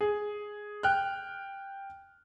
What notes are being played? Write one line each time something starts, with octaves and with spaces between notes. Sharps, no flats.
G#4
G5 F6 F#6